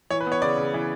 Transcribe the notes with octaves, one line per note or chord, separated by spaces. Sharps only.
E3 C#5
B4
B3
C#5
C#3 D5
C#3
E3